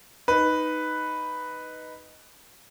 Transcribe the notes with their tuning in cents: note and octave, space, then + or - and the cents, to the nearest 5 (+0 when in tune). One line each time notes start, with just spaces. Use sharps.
D#4 +0 B4 +0